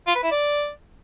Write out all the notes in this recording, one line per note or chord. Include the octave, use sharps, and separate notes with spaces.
F4
B4
E4
D5